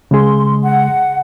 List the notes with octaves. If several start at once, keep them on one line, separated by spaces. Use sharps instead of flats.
C#3 G#3 G#4 C6
F#5